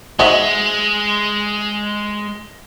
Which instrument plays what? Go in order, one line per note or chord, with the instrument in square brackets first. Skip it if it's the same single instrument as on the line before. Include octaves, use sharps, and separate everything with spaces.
[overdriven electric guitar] G#3 [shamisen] D#4 F#4 D#5 [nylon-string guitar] C5 E5